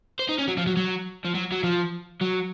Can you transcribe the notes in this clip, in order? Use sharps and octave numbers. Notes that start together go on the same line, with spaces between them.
C5
D#4
C#4
F#3
F3
F#3
F#3
F3
F#3
F#3
F3
F#3